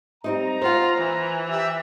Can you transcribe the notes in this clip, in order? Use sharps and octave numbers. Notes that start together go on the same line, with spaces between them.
G3 C4 D#4 A#5
F4 C5 F#5
E3
G4 E5